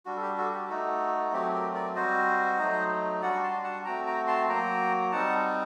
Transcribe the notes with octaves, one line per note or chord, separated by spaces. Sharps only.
G3 D4 F#4
A4
G4
F#4 A4
G4
A3 D#4 F#4 A4
F#3 A3 C4 G4
G4 A#4
A#4 D5
G3 C4 F#4 C5 D#5
F#3 A3 D#4
G3 D4 F#4 D5 F#5
A5 C6
F#5 A5
A3 C4 F#4 G5 A#5
G5 A#5
A5 C6
F#3 A#3 F#4 G5 A#5
G3 C4 D#4 F#5 A5